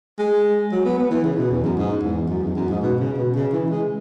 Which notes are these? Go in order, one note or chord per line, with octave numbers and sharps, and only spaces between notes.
G#3
F#3
B3
B3
E3
C#3
B2
E2
F#2
G#2
E2
F#2
E2
F#2
G#2
B2
C#3
B2
C#3
E3
G#3